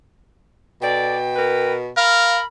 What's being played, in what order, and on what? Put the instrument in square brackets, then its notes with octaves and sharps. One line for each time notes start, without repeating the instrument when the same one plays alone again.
[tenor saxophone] B2 [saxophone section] A4 D5 [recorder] G5
[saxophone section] A#4 B4
[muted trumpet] A#4 [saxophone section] F5 [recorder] B5